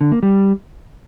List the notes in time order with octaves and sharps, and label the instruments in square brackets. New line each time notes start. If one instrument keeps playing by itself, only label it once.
[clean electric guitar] D3
A#3
G3